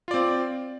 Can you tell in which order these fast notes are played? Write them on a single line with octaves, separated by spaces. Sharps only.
F4 D5 C4